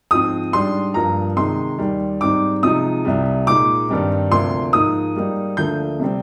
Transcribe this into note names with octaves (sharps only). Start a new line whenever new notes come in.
G#2 F3 C4 D#6
G#2 G3 D4 C6
G2 F3 A#3 A#5
C3 D#3 G#3 D#4 C6
D#2 D#3 G3
G#2 G3 C4 D#4 D6
C3 F3 G#3 D#4 D#6
C2 C3 G3
A#2 G#3 D#4 D6
G2 D#3 G3 C4 D#4
D2 C3 F3 A#3 D4 C6
G#2 F3 A#3 D#4 D#6
G#2 G3 A#3 D#4
D2 D3 F3 A#3 G6
C3 G3 C4